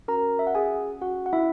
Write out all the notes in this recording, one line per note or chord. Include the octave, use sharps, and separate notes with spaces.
C#4 F#4 A#4 A#5
E5
F#5
G#4 G#5
F#4 F#5
F#5
E4 E5